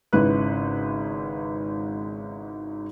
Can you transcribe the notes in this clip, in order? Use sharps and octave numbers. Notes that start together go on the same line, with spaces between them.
G#1 G#2 C#3 E4 B4 F#6